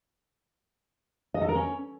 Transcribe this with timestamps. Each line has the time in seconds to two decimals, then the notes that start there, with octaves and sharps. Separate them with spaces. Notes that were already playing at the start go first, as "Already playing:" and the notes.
1.34 D#5
1.41 A4
1.48 A#4
1.55 C#4